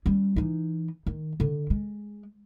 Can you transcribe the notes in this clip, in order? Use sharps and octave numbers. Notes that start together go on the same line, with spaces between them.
G3 C#4
E3 D#4
D#3
D3
G#3